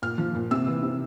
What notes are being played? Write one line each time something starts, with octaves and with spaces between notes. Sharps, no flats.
A#2 F6
F3
A#2
C3 E6
E3
C3